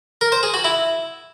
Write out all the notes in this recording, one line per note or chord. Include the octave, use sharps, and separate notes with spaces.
A#4
C5
G#4
F#4
E4